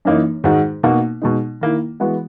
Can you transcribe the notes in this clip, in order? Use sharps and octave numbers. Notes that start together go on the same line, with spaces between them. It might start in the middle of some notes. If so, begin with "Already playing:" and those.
F#2 E3 A#3 D#4
G#2 D#3 G#3 D#4 F#4
B2 A#3 D#4 F#4
B2 G#3 D#4
D#3 A#3 E4
E3 G#3 B3 F#4